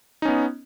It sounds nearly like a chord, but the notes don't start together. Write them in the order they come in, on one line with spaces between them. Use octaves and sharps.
D#4 C#4 B3